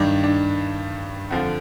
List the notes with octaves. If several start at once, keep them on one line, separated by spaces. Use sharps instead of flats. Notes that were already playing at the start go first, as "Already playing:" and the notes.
Already playing: G2 D#3 D4
D4
F2 D3 F3